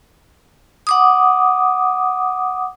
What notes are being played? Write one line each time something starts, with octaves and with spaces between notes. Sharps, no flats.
F#5 D6 D#6